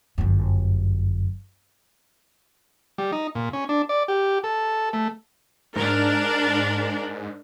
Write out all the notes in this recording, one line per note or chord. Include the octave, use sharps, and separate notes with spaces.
G1 F#2
G3
D#4
A#2
C#4
D4
D5
G4
A4
A3
G#2 D4 A#4